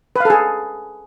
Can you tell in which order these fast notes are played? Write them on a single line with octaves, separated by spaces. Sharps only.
B4 F5 A4 G#4